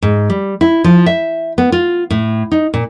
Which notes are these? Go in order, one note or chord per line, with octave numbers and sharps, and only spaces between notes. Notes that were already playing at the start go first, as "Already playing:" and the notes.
G#2
G3
E4
F3
E5
B3
F4
A2
D#4
A#2